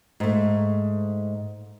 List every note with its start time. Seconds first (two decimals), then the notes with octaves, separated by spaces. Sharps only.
0.20 G#2 A3